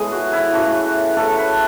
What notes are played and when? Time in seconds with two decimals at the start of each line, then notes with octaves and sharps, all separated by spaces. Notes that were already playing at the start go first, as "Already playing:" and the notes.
Already playing: A2 G#3 B3 G#4
0.12 F#4
0.32 E4
0.53 C#3 E3 A3 E4 F#4
1.16 A2 F#3 A3 A4
1.37 B4